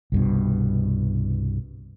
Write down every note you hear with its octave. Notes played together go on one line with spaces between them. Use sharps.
C2 G2 B2